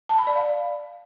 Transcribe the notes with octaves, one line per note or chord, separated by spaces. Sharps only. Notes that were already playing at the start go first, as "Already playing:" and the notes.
A5
B5
D5
F5